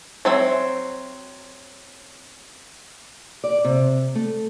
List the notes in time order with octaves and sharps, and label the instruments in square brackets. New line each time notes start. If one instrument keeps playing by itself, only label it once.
[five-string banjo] F#3 C4 E5
[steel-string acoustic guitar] D5
C3
A3